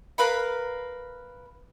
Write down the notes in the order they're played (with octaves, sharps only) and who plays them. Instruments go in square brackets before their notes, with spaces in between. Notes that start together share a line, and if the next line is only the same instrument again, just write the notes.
[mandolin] A#4 B4 F5 B5